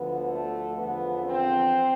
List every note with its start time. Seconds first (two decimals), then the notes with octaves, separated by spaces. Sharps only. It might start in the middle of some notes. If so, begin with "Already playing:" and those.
Already playing: D2 D3 F3 B3 B4
0.30 A3 A4
0.77 E2 D3 F3 B3 B4
1.25 C4 C5